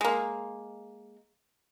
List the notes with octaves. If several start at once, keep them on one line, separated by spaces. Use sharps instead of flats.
G#3 A#3